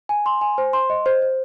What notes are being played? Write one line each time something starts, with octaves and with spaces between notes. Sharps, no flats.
G#5
C6
G#5
C5
C6
D#5
C5
C5